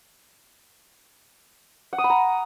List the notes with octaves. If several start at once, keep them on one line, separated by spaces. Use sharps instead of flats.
F#5
D#6
B5
A#5